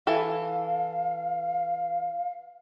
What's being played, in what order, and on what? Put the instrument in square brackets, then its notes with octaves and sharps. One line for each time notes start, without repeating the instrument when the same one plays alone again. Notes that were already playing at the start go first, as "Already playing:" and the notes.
[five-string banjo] E3 A4 G#5 [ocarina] F5